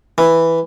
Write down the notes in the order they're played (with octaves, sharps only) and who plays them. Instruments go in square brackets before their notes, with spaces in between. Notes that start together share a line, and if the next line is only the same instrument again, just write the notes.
[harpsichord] E3